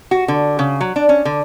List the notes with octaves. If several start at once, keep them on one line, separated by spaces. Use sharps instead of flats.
F#4
D3
C#3
F#3
D4
C#4
D3